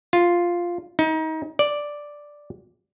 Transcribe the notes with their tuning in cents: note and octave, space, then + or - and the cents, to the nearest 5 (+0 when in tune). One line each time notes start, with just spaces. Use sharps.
F4 +0
D#4 +30
D5 +0